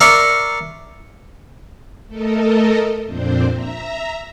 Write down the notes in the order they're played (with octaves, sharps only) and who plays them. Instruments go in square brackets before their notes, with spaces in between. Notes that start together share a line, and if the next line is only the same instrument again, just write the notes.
[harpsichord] A#4 D5 E5 A#5 C6 C#6
[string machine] A3 A4 A#4 D#5
F2 A#2 C4 D4 C5
E5 A#5